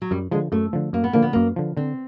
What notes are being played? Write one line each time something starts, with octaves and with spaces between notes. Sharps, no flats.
F#3
F#2 G3
D3 F3 G#3
F#2 A3
D3 F3
F#2 A#3
B3
D3 F3 A#3
B3
F#2 A#3
D3 F3
D3 C4